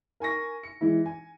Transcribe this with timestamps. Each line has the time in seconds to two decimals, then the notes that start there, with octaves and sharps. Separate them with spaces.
0.20 A#4 G#5 C#6 A#6
0.63 C#7
0.81 E3 G#3 E4
1.06 G#5